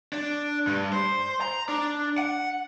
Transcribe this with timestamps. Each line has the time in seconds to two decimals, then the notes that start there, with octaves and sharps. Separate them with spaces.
0.13 D4
0.67 G2
0.93 C5
1.41 A#5
1.69 D4
2.18 F#5